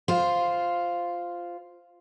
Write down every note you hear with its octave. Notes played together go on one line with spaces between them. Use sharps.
F4 C5